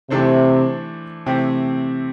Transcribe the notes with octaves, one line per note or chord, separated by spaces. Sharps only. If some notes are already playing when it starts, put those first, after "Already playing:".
C3 E3 A3 D4 A4 C5
C3 E3 A3 C4 G4